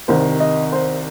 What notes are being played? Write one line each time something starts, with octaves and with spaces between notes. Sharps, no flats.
C2 C3 D#3 C5
D#5
C5